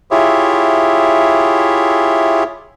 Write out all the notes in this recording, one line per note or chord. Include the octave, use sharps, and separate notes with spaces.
E4 F4 G4 G#4 C#5 E5